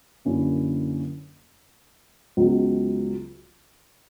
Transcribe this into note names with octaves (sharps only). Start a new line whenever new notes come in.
F#2 D3 A#3 C#4 E4
C#2 C#3 F#3 B3